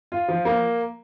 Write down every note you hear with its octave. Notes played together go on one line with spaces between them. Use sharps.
F4
F3
A#3